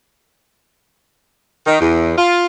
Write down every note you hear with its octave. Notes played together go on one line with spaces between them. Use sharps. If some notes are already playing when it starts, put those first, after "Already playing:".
D#3
E2
F4